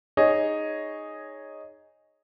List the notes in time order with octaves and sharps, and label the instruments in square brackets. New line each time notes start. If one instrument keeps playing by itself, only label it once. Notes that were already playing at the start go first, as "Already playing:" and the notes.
[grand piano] D#4 G#4 C#5 D#5